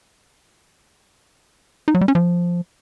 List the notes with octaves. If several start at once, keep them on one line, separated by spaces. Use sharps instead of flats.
D#4
F#3
G3
C#4
F3